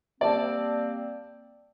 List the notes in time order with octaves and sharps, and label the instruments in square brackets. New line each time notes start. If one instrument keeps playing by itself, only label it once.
[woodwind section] G3 A#3 C4 [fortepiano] D5 A5